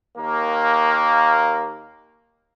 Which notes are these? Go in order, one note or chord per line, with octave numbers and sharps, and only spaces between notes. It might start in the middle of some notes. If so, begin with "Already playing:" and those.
D#2 A#3